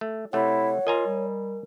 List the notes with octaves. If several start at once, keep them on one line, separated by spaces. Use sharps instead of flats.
A3
C3 A3 E4 C#5 F#5
F4 A#4 D#5 G#5 A#5
G3